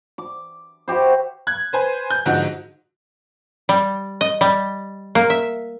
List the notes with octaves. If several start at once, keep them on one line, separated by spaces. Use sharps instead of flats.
D6
E4 F#4 G4 C5
F#6 G#6
B4 C5 G#5
G6
G#2 D3 F3 D#4 F#4
G3
D#5
G3
A#3
E5